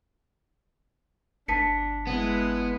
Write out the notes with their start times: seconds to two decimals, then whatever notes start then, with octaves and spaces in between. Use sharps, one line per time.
1.48 G1 D4 A5 B6 C#7
2.07 G#3 B3 E4